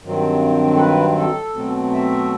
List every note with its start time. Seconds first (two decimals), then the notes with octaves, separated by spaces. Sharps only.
0.04 G2 D#3 F#3 C4
0.75 A4
0.79 B4
1.17 A4
1.55 B2 F#3 A3 C4
1.93 E5